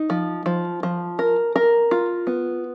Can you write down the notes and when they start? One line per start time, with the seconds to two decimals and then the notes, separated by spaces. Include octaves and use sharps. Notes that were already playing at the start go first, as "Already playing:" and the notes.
Already playing: D#4
0.10 F3
0.46 F3
0.83 F3
1.19 A#4
1.56 A#4
1.91 F4
2.27 B3